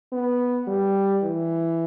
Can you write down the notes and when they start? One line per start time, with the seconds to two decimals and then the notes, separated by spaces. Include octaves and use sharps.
0.12 B3
0.67 G3
1.23 E3